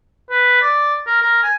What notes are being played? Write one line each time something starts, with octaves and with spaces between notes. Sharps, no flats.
B4
D5
A#4
A#4
G#5